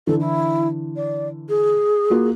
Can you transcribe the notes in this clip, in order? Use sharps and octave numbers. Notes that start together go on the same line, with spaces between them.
D3 E3 A4
E4
D5
G#4
A#3 F4 F#4